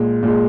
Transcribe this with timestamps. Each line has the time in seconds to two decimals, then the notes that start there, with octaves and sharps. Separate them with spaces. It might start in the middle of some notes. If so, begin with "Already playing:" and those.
Already playing: A#2 G#3
0.23 A#2 G#3